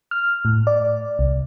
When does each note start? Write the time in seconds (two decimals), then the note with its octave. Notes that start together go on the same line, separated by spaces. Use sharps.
0.11 F6
0.45 A2
0.67 D5
1.19 C2